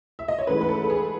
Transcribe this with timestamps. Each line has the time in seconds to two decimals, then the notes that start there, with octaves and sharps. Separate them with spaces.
0.19 E5
0.28 D#5
0.39 C#5
0.47 G#2 E3 A3 C#4 B4
0.61 B4
0.69 A4
0.84 A4
0.90 G#4